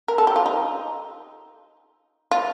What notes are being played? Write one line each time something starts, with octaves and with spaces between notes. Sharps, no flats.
A#4
A4
G4
F4
D#4
F4